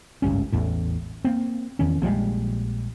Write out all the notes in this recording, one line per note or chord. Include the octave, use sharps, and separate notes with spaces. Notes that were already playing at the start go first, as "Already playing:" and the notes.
G#1 C#2 G2 C#4
A1 E2 A2
A#3 C4
E2 D#3 C#4
A#1 F3 G3 G#3